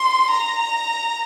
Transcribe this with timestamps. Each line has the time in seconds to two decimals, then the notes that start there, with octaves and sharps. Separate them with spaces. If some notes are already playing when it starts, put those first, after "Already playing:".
Already playing: C6
0.31 A#5